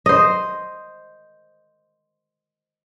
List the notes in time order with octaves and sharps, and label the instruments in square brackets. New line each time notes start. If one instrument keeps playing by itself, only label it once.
[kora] C5 D#5